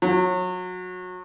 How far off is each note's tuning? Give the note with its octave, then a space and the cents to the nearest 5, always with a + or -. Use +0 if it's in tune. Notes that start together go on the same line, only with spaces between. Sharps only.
F#3 -25